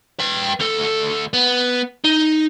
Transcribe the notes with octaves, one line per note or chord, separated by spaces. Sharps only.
B4 G5
D2 A4
B3
D#4